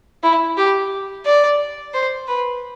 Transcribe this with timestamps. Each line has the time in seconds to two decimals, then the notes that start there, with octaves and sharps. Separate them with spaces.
0.23 E4
0.57 G4
1.26 D5
1.94 C5
2.28 B4